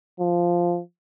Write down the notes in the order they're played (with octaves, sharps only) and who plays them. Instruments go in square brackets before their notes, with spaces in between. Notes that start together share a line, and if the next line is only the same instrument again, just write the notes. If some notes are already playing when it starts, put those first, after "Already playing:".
[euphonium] F3